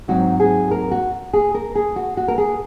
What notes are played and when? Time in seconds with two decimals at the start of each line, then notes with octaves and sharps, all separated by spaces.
0.08 G#2 F#3 C4 D#4 F#4
0.40 G#4
0.71 A#4
0.91 F#4
1.33 G#4
1.54 A#4
1.75 G#4
1.96 F#4
2.17 F#4
2.28 A#4
2.38 G#4